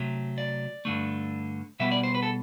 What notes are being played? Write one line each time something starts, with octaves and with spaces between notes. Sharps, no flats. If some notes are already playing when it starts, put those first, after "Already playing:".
Already playing: C3 F#3 A3
D5
G2 D3 A3
B2 G3 B3 E5
D5
C5
B4
A4